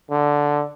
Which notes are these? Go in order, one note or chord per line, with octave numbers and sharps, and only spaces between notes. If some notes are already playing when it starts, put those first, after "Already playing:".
D3